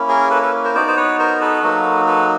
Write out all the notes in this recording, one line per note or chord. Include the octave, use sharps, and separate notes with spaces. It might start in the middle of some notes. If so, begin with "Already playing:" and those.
Already playing: A#3 C#4 E4
G#4 A#4
A4 B4
A4 B4
A#4 C5
B3 D#4 F#4 C5 D5
C5
B4 C#5
A#4 C5
A4 B4
F#3 A#3 D#4 F#4
A4 B4